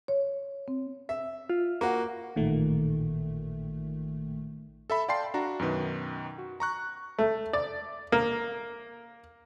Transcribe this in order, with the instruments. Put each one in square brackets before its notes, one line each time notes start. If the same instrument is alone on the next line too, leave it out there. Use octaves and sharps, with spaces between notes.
[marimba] C#5
C4
[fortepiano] E5
[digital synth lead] F4
[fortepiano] A#3 F#4
[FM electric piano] A1 A#2 D#3 A3
[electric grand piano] A4 E5 B5
D5 F5 G5 A5 C6 C7
D4 F#4 A#5
F#2 B2 D#3 B4
F#4
A#5 C#6 F#6
[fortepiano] A3
D5
A#3